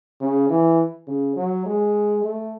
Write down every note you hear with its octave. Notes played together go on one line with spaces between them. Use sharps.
C#3
E3
C#3
F#3
G#3
A3